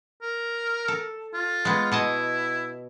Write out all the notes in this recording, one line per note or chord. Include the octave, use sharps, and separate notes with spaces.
A#4
A4
F4
G#3 B3
B2 E4 D#5 A5